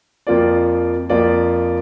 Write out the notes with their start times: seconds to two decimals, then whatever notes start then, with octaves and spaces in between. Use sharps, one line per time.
0.27 F2 F3 A#3 F4 D5
1.10 F2 F3 A#3 F4 D5